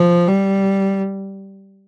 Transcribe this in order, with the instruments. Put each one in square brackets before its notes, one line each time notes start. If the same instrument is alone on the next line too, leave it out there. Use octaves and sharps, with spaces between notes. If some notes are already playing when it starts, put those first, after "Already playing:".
Already playing: [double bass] F3
G3